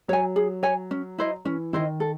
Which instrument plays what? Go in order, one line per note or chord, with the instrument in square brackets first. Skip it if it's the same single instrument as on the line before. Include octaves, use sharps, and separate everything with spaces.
[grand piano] F#3 [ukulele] C#5 G#5
[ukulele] G#4
C#5 G#5
C#4
E4 C5 D#5
[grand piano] E3 [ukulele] C#4
[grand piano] D#3 [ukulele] E4 C5 D#5
[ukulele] A4